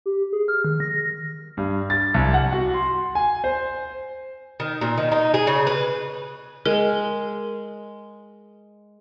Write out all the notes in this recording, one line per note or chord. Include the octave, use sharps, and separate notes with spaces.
G4
G#4
F6
D#3
A#6
G2
A6
C2
F#5
F#4
C6
G#5
C5
D#3
A#2
D#3
D#4
G#4
C#3
B4
G#3 A#4